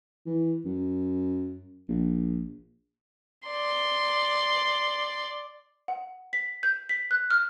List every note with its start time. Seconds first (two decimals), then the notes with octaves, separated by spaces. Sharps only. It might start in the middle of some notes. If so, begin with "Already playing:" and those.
0.26 E3
0.65 F#2
1.89 A#1
3.49 D5 C6
5.88 F#5
6.33 B6
6.63 G6
6.89 B6
7.11 F#6
7.31 F6